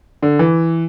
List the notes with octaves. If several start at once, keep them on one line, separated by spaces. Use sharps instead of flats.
D3
E3